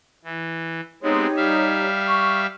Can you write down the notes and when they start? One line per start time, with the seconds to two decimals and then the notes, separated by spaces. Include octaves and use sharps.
0.25 E3
1.02 G#3 B3 C4 D#4 G4 C#5
1.37 G3 E5 F5
2.08 C#6